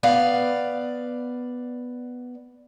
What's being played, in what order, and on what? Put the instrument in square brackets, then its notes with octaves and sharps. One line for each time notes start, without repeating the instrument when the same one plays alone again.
[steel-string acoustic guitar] B3 D5 F5